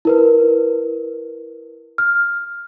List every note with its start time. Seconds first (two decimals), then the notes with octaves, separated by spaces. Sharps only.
0.05 E4 A#4 B4
1.98 F6